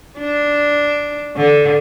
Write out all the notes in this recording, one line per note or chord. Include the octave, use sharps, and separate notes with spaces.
D4
D3